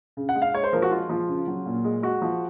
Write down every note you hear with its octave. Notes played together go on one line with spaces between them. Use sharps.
C#3
F#5
G#3
F5
G#3 C#5
C5
F3 A#4
F#4
G#3 F4
F3
C#3
F#3
A#2
G#3
G#3 F#4
F3